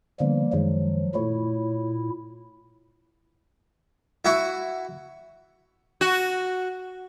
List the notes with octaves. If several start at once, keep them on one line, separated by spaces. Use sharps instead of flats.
D3 F3 G3 A#3 B3
F#2 D#3 F3 F#3 G#3
A#2 A3 E4 C#5
E4 F#4
F#4